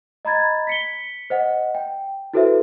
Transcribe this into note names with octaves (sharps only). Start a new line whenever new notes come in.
D#5 A#5 B5 G#6 A6
B6 C#7 G7
C5 D#5 F#5
G5
E4 F#4 A4 B4 C5 E5